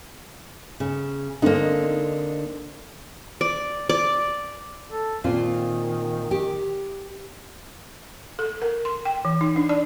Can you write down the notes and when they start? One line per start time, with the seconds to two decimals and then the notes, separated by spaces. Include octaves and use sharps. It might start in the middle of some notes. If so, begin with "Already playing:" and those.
0.80 C#3
1.42 D3 A#3 C4 D#4
3.41 D5
3.89 D5
4.91 A4
5.24 A#2 D#3 C4 F4
6.31 G4
8.39 A4
8.62 A#4
8.85 C6
9.05 G5
9.25 E3
9.41 D#4
9.56 D4
9.69 D5